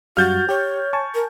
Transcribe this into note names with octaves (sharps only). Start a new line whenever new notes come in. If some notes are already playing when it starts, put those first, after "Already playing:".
F#2 G3 F#4 F5 F6 G6 A6
G4 C#5
G#5 A5 C#6
A#4